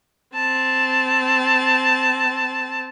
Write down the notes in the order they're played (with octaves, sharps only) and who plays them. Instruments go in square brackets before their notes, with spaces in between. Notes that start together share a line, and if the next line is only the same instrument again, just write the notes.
[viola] C4 A5